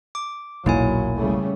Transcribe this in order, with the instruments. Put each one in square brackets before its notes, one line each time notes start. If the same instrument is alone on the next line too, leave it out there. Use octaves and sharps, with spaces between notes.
[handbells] D6
[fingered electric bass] E1 B1 [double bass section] A#2 F#3 [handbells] A#3 E4 G#5
[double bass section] C#3 G3 A3